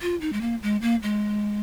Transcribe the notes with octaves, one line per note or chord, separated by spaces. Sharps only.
F4
D#4
G#3
A#3
G#3
A#3
G#3